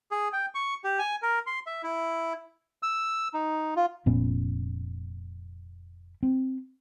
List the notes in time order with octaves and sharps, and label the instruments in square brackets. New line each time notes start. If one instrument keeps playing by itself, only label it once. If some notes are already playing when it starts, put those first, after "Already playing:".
[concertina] G#4
G5
C#6
G4
G#5
A#4
C6
E5
E4
E6
D#4
F4
[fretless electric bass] F1 A#2 B3 C#4
C4